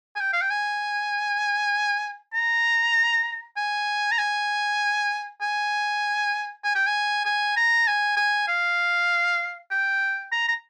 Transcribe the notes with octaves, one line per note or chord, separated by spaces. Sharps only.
G#5
G5
F5
G5
G#5
A#5
G#5
A#5
G#5
G#5
G#5
G5
G#5
G#5
A#5
G#5
G#5
F5
G5
A#5
A#5